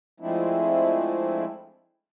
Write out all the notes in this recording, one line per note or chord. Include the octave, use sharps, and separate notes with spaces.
F3 G#3 A3 C4 D4 E4